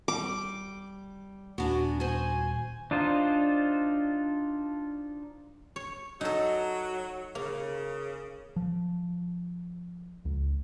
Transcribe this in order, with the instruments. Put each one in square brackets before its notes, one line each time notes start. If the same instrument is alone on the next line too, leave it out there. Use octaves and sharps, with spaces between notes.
[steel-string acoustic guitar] G3 [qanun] D6
[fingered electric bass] D#1 [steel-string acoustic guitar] B3 D4 G#5 [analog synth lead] F#4
[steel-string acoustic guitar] F#4 C5 [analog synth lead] G#5
[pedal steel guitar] D4 D#4 F4 C5
[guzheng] C#5
[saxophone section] F#3 [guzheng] D#4 A4
[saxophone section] C#3 [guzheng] A#3
[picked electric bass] F3
C#2